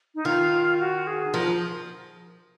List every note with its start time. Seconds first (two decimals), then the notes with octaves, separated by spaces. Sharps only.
0.15 D#4
0.25 D#3 F4
0.80 F#4
1.07 G#4
1.34 F3 A#4